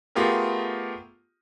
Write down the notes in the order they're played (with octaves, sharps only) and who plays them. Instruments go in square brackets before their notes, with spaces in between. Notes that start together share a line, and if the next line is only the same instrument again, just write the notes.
[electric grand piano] A3 B3 F4 G4 G#4 A#4